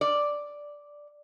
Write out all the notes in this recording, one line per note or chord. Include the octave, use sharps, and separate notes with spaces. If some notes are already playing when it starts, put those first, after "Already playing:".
D5